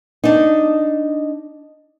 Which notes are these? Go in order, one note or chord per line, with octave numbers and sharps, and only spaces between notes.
D4 D#4